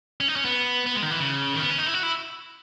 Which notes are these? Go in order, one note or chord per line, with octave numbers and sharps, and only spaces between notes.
C#4
D#4
C#4
B3
B3
G#3
D#3
E3
C#3
D#3
B3
C#4
D#4
E4
F#4
E4